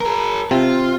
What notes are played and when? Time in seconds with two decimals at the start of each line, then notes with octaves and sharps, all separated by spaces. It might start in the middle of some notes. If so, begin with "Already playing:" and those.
0.01 G#4 A#4
0.51 C3 C4 F4